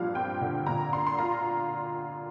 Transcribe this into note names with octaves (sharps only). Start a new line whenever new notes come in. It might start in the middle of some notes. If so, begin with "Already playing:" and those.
Already playing: G2 A#2 F3 F5
C4 G5
D3
A#2 A#5
D4 C6
C6
F4 A#5